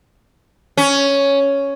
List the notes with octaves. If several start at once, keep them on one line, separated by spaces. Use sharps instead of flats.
C#4